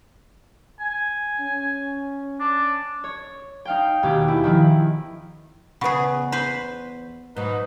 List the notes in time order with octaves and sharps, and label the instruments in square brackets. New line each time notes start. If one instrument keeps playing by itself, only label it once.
[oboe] G#5
[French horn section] C#4
[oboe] D4
[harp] C#5
D#4 F5 G5
D#2 B2 G4 G#4
E4
D#3 F3 E4
[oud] E2 B3 [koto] C#3 G#4 [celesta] F#5 B5 C#6
[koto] B4 C5
[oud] G#2 F#3 [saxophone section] D#4 B4